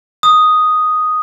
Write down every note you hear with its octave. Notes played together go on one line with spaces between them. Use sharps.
D#6